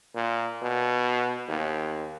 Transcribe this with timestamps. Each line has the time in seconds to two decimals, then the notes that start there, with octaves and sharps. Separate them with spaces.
0.15 A#2
0.62 B2
1.48 D#2